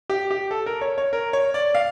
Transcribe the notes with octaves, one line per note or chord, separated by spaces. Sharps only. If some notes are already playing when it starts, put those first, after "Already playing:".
G4
G4
A4
A#4
C#5
C#5
A#4
C#5
D5
F5